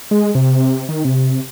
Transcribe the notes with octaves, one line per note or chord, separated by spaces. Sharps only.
G#3
C3
D#3
C3